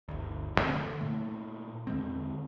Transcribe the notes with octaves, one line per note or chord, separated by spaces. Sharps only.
G1 D2
D#1 G2 A3 C4
D3
A#2 A3
E2 D3 G#3 C4